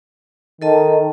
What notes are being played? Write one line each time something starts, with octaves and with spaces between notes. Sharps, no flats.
D#3 A4 D#5 A5